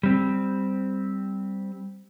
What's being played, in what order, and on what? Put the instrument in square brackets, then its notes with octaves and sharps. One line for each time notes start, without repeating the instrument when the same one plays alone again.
[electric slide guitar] G3 C4